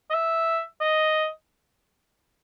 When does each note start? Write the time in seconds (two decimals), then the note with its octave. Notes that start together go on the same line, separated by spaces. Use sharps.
0.10 D#5
0.14 E5
0.81 D#5